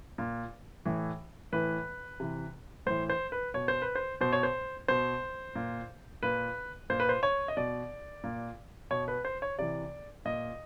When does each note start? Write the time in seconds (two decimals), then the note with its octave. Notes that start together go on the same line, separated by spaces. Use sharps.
0.18 A#2
0.85 A2 E3
1.52 A2 E3 B4
2.20 C3 E3
2.86 A2 E3 C5
3.10 C5
3.32 B4
3.54 B2 C#5
3.68 C5
3.82 B4
3.95 C5
4.21 B2 C5
4.33 C#5
4.43 C5
4.88 B2 C5
5.56 A#2
6.23 A#2 B4
6.90 A#2 C5
7.00 B4
7.09 C5
7.23 C#5
7.48 D#5
7.57 B2 D5
8.24 A#2
8.91 B2 C#5
9.08 B4
9.25 C5
9.42 C#5
9.59 C3 E3 D5
10.25 A#2 D#5